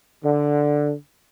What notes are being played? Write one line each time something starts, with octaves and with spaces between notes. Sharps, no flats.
D3